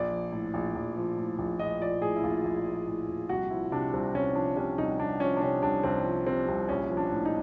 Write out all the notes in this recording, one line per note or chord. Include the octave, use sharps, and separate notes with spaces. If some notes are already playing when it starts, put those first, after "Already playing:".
Already playing: A#1 D5
F3
A2
A#1
A#1
F3
A2
A#1
A#1 D#5
F3 D5
A2 G#4
E4
A#1 F4
A#1
F3
A2
A#1
C2 F#4
F3 E4
C3 D4
C2 C4
C2 C#4
F3 D4
C3 C#4
C2 D#4
C2 D4
F3 C#4
D4
C3 C#4
C2 D4
C2 C4
F3
C3 C4
C2
A#1 C#4
F3
D4
A2
D#4